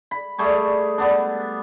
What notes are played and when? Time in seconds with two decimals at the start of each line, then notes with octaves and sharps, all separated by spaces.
0.11 B5
0.38 G3 A3 G#4
0.98 B3 D4